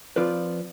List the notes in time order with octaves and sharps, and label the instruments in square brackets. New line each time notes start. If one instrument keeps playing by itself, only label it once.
[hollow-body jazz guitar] F3 C4 F4 B4 D5